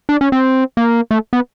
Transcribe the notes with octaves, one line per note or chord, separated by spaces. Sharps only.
D4
C#4
C4
A#3
A3
B3